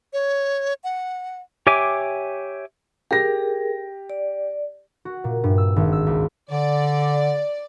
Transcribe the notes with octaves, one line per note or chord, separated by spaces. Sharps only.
C#5
F#5
G4 C#5 E5 G#5 D6
G4 G#4 A#4 A#6
D5
F#4
A#2
G2
E6
G#1
E6
C#2
D3 D5